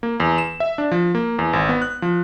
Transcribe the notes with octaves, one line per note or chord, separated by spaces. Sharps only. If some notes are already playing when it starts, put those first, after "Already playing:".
A#3
E2
E7
E5
D4
F3
A#3
E2
G#1
B3
F#6
F3